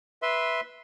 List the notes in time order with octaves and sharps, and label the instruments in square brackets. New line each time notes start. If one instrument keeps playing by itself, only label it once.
[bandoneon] B4 E5 C6